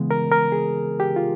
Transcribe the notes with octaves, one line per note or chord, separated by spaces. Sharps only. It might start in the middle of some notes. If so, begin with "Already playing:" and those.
Already playing: C#3 E3 G#3 B3
A#4
A#4
G#4
G4
F4